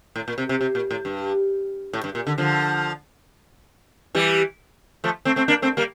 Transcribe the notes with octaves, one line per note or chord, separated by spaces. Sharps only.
A2
A#2
C3
C3
C3
A#2
A2
G2
A2
G2
A#2
D3
D3 F3
E3 G3
F3 A3
A3 C4
A3 C4
A#3 D4
A3 C4
G3 A#3